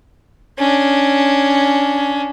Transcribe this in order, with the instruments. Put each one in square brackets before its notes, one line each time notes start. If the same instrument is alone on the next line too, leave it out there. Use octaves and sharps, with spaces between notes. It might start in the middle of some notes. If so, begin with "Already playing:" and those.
[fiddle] C#4 D4